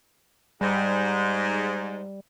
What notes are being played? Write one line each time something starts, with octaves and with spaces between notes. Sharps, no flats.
G#2 G3